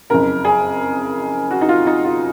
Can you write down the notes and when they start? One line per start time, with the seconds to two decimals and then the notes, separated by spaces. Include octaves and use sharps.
0.10 F#1 F2 C#3 A#4
0.45 G#4
1.51 F#4
1.61 D#4
1.69 F4
1.87 D#4
2.04 F4